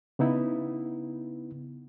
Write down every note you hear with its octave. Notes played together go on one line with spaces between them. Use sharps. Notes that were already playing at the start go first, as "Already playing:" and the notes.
C#3 B3 D#4 E4